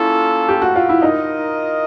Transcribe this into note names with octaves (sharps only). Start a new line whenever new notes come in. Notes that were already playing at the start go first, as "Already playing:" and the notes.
Already playing: A#3 C#4 E4 F4 A4
G4
F#4
F4
E4
D#4 F4 A#4 D#5